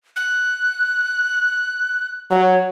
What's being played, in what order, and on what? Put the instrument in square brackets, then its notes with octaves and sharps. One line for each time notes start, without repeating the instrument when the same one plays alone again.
[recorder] F#6
[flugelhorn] F#3 [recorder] C#5